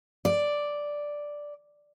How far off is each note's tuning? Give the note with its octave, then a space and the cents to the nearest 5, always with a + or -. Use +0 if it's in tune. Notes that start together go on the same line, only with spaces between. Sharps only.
D5 +0